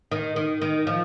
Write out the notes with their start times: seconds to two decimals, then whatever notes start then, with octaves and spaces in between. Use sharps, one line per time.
0.12 D#3
0.36 D#3
0.62 D#3
0.87 F3